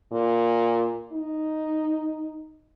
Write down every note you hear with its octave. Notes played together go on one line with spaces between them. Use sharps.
A#2
D#4